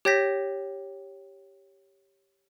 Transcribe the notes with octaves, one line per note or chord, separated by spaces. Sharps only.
G4 C#5 G5 G6 A#6 B6